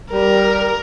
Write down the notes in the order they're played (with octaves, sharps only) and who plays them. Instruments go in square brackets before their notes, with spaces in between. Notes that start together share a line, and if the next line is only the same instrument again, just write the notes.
[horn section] G3 [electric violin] A#4